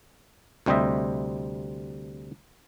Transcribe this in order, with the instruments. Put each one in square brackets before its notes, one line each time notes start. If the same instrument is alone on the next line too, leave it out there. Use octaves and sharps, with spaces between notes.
[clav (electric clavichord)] D2 C3 G3 C5 D#5 E5